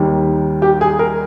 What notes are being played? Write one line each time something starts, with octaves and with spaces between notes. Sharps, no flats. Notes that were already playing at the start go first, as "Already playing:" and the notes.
Already playing: D#2 D#3 G3
G4
G#4
A#4